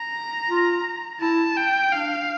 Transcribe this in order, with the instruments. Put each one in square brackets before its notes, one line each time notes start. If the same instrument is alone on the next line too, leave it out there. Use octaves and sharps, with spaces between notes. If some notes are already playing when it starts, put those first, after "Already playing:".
Already playing: [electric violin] A#5
[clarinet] F4
[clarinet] E4 [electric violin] A5
[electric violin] G5
[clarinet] D4 [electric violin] F5